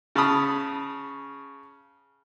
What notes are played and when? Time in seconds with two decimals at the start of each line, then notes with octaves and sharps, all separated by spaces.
0.15 C#3 A5 B5 D#6